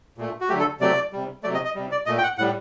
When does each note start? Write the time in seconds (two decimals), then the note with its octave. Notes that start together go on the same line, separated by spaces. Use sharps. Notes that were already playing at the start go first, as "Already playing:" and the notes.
0.18 A#2 A3
0.41 F#4
0.49 D3 F#3 A3 G4
0.59 A4
0.80 C3 F#3 A3 D5
1.13 C3 G3
1.43 C3 F#3 A3 D5
1.54 D#5
1.65 D#5
1.75 C3 G3
1.91 D5
2.06 A#2 A3 D#5
2.18 G5
2.23 F#5
2.38 A2 G3 F#5